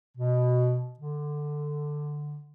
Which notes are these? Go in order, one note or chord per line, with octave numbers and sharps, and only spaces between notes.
B2
D3